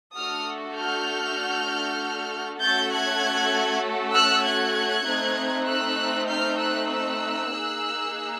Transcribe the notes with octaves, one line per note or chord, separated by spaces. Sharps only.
A3 D4 F#4 A4 D#6 F6
F6 G6
A3 C#4 F#4 A4 G6 A6
F#6 G#6
E6 F#6
F#6 G#6
A3 C4 D#4
E6 F#6
F6 G6
E6 F#6
E6 F#6
A#3 D#4 G#4